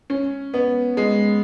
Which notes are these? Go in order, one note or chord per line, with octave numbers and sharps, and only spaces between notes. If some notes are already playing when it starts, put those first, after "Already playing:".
C#4
B3
G#3